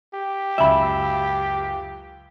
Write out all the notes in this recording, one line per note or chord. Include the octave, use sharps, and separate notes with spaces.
G4
C#2 F#2 E5 B5